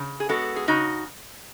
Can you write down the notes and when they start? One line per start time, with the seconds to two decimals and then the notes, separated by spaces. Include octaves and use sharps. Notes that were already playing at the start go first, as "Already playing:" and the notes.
Already playing: C#3
0.20 G#4
0.29 G#3 B3 F#4 A4
0.56 G#4
0.68 C#3 D#4 F#4